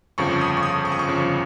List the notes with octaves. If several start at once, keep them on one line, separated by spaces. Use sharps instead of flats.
G1 F2 C#3 F3 C#6
D#6
C#6
D#6
C#6
D#6
C#6
G1 F2 C#3 F3